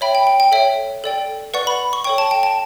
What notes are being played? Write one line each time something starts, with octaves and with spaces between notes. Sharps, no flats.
C#5 E5 G5 B5
G5
G5
G5
A4 C#5 E5 G5
A4 D5 G5
B4 D5 F#5 C#6
B5
C#6
A4 C#5 G5 C#6
A5
G5
A5